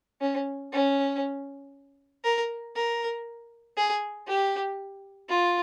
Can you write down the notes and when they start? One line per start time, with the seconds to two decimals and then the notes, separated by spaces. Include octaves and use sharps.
0.21 C#4
0.72 C#4
2.24 A#4
2.75 A#4
3.77 G#4
4.27 G4
5.29 F4